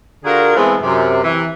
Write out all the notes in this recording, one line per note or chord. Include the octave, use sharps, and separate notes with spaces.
D3 F4 F#4 G#4 A#4
E3 G#3 A3 B3 C4 E4
F#2 C3
C3 E3